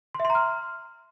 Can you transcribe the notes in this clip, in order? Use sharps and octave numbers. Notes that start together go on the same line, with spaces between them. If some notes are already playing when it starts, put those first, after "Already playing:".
C6
E5
C6
A#5
F6